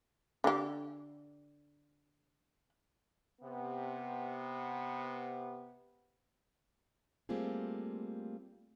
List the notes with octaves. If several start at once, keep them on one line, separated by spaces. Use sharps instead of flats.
D3 G4
C3 B3
G3 A3 A#3 C4 F4 G#4